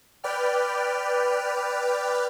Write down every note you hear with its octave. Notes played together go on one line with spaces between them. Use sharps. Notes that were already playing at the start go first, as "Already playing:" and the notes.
B4 D5 G5 F6